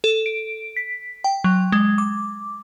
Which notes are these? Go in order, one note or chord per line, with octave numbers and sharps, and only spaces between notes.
A4
D7
B6
G5
F#3
G#3
D6